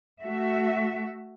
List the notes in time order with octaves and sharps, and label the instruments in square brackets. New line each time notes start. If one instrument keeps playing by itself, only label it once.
[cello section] A3 F#4 E5